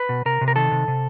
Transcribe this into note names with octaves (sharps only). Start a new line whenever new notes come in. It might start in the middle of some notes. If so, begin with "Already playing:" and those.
Already playing: B4
B2
C3 A#4
C3
A#4
D#3 A4
C3
C3